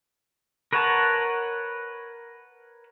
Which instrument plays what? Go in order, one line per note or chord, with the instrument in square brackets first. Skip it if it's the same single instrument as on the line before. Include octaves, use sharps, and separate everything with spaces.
[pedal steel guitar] A#4 B4 C#5 F#5 A5